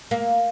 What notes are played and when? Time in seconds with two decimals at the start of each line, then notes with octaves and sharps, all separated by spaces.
0.11 A#3